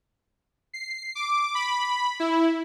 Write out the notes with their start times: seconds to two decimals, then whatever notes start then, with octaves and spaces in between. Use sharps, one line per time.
0.74 C7
1.15 D6
1.55 B5
2.20 E4